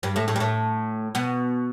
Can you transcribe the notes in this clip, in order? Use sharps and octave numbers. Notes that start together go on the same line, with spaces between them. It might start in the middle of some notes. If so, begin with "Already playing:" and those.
G2 G3
A2 A3
A2 A3
G3
A2 A3
B2 B3